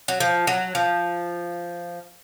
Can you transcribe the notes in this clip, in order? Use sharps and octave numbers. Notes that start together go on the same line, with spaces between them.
F#3
F3
F#3
F3